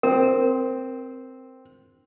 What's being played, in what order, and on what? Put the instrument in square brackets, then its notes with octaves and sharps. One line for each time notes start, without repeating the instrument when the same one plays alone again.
[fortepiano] C4 [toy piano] A#4